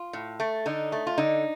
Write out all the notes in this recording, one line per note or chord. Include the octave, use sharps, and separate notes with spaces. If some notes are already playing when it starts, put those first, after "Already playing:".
Already playing: F4
A2
A3
D3 D#4
A3
F4
D3 D#4